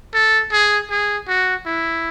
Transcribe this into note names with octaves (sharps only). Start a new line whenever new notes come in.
A4
G#4
G#4
F#4
E4